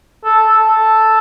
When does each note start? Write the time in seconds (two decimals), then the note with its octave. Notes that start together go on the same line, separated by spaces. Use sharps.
0.25 A4
0.46 A4
0.67 A4